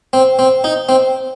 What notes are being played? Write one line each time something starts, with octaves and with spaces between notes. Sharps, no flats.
C4
C4
D#4
C4